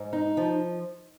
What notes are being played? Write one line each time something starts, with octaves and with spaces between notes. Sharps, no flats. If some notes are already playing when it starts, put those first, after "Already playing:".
Already playing: G#2
D#4
F3